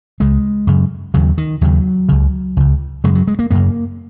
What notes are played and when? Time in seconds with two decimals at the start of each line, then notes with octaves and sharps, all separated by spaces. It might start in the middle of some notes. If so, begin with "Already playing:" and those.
0.20 C#2 C#3 G#3
0.67 F#2 C#3
1.14 D#2 C#3 F#3
1.38 D#3
1.61 D#2 C#3 F#3
2.09 C#2 C#3
2.57 C#2 C#3
3.04 F#2 C#3 G#3
3.15 F#3
3.27 G#3
3.39 A#3
3.51 F#2 C#3 A#3